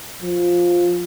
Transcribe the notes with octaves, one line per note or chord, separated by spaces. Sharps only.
F3